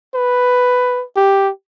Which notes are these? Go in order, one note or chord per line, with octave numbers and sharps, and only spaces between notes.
B4
G4